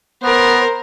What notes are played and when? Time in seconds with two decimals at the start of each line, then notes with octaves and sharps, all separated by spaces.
0.23 B3 A#4 C5